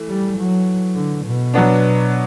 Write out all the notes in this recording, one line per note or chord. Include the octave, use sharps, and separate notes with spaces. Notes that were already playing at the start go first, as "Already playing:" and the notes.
Already playing: E3 A3
G3
F#3
D3
B2
F#3 B3 D4